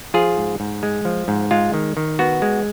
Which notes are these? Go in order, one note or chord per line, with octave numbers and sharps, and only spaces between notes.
F3 F4 G#4
G#2
G#2
G#3
F3
G#2
G#3 F4
D#3
D#3
B3 F#4
G#3